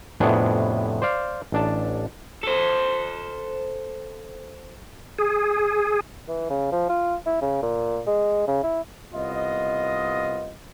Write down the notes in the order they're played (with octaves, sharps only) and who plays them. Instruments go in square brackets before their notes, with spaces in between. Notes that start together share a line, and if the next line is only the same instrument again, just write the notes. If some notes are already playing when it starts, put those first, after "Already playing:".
[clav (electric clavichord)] F2 A2 C3 B3 D4 G#4
C5 D5 F5
A1 D4 A5
[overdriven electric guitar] A4 C5
[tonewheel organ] G#4
[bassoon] E3
C#3
F3
F4
E4
C#3
A#2
G#3
C#3
E4
[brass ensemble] C2 B3 F4 D#5